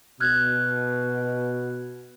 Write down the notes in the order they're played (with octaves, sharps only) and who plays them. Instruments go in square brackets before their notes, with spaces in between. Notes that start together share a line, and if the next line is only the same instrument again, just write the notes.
[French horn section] B2 [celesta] F6 F#6 G#6